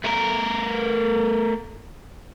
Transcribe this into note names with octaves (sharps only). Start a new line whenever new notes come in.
A3 A#4